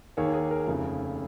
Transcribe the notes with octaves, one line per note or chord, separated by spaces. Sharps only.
D#2 D#3 A#3 G#4 C#5
G#4
A#4
F1 D#2 C#3 F3